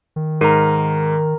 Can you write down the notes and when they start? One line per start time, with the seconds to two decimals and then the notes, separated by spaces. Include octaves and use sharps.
0.16 D#3
0.41 G#2 A#4 A#5